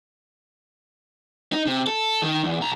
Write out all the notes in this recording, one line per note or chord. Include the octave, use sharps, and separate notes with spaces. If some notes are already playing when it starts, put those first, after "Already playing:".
D#4
C3
A4
D#3
E2
B1 A#5